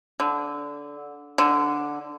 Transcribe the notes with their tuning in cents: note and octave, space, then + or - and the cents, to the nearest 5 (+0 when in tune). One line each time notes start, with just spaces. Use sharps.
D3 -15
D3 +0